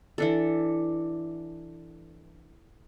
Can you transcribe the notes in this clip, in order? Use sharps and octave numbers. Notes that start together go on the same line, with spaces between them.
E3 D4 A4